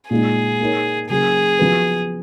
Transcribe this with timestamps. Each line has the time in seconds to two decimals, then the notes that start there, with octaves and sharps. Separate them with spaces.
0.10 A#2 G#3 D#4 G#4
0.60 A#3 D#4 A#4 C#5
1.09 C#3 F#3 A#3 G#4
1.59 F3 B3 F#4 B4